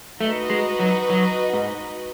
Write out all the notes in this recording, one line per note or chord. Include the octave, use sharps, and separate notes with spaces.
A3 D#4 F#4 B4 D#5
G#3
F#3
F#3
G#2